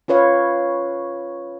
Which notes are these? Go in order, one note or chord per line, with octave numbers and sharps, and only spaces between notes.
C#4 F4 B4 C#5 F5